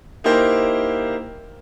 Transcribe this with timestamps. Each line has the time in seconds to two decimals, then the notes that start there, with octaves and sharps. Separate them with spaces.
0.24 A#3 D#4 E4 G4 A#4 C5